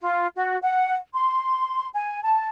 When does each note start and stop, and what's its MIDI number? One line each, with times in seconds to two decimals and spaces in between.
0.01 0.26 65
0.36 0.56 66
0.62 0.95 78
1.13 1.88 84
1.94 2.21 80
2.24 2.47 81